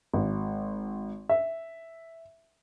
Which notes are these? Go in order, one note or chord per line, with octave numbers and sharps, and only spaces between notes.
G#1
E5